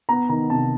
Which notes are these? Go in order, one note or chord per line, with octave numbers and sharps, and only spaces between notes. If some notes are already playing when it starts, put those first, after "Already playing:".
B3 A#5
D#3 A#5
C3 A5